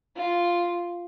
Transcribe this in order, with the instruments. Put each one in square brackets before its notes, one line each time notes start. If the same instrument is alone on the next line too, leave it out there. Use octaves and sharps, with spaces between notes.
[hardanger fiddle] F4